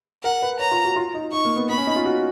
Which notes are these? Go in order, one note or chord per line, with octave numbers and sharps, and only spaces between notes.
A#4 F#5
B4
C#5 A#5
F4
F#4
F4
D#4
D#4 C#6
A#3
B3
B3 B5
C#4
D#4
F4
F#4